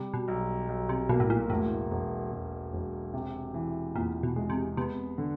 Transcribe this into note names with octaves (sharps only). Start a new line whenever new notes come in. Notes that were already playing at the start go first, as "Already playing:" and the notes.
Already playing: C3 G3
B2
B1
B1
C3
B2 A#3
A2
A#2
E1 A2
E1
E1
E1
C3
E3
E2 A#2
B2
G#3
C3
C3 B3
D3